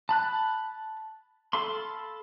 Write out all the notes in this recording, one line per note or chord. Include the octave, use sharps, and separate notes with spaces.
A5 B5 F#6
A4 F5 B5 C6